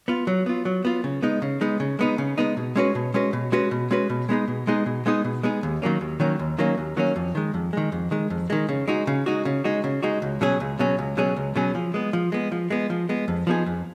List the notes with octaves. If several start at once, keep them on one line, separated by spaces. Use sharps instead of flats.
B3 F4
F#3
B3 F4
F#3
B3 F4
C#3
G#3 B3 D#4
C#3
G#3 B3 D#4
C#3
G#3 B3 D#4
C#3
G#3 B3 D#4
B2
G#3 C#4 F#4 B4
B2
G#3 C#4 F#4 B4
B2
G#3 C#4 F#4 B4
B2
G#3 C#4 F#4 B4
B2
G#3 B3 D#4 G#4
B2
G#3 B3 D#4 G#4
B2
G#3 B3 D#4 G#4
B2
G#3 B3 D#4 G#4
D#2
D#3 F#3 A#3 C#4
D#2
D#3 F#3 A#3 C#4
D#2
D#3 F#3 A#3 C#4
D#2
D#3 F#3 A#3 C#4
F2
D#3 G#3
F2
D#3 G#3
F2
D#3 G#3
F2
D#3 G#3
C#3
G#3 D#4 F#4
C#3
G#3 D#4 F#4
C#3
G#3 D#4 F#4
C#3
G#3 D#4 F#4
C#2
B2 F#3 C#4 G#4
C#2
B2 F#3 C#4 G#4
C#2
B2 F#3 C#4 G#4
C#2
B2 F#3 C#4 G#4
F3
G#3 B3
F3
G#3 B3
F3
G#3 B3
F3
G#3 B3
F2
F3 B3 D#4 G#4
F2